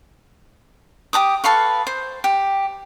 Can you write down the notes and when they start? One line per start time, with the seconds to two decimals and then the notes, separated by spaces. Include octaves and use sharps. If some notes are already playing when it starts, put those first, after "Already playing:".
1.13 G4 A#5 D6 D#6
1.44 A4 B4 F5 C#6
1.87 C5
2.24 G4